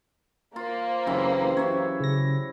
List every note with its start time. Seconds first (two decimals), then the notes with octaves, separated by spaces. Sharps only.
0.56 A#3 F4 C5
1.07 F#1 C3 E3
1.57 F#2 C#5 E5
2.00 C#3 A#6